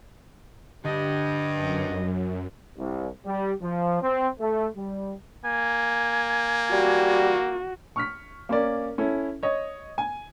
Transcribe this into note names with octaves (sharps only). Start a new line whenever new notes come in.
G2 D3 G4 D#5
F#2
C2
G3
F3
C4
A3
G3
A#3 G#5
G3 F#4
C#6 F6 B6
A#3 C#4 D5
C#4 E4 A4
C#5 D#5
G#5